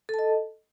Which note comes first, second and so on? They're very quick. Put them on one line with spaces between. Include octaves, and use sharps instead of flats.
A4 A5 D#5